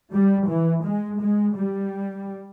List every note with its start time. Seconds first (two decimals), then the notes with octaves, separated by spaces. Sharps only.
0.13 G3
0.48 E3
0.84 G#3
1.20 G#3
1.56 G3